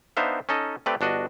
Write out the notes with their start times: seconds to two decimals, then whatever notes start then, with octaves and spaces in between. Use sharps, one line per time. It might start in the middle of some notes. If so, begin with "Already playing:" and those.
0.17 B3 D4 D#4 C5 E5 F5
0.49 C#4 D#4 A4 D#5
0.86 A3 C4 G4 B4 D5 G5
1.01 G1 D4 F#4 D#5